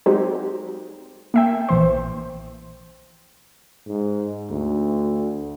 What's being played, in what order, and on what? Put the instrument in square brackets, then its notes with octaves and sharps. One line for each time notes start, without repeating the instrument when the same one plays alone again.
[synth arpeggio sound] F#3 G#3 C4 D#4 G4
A#3 E5 G5
A#1 E3 C5
[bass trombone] G#2
D2